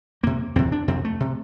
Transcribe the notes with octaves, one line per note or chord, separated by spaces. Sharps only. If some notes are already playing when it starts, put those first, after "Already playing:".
F2 C3 A#3
E2 C3 C4
D4
F2 C3 C4
A3
C3